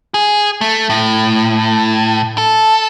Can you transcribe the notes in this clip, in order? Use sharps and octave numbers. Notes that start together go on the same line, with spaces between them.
G#4
A3
A2
A4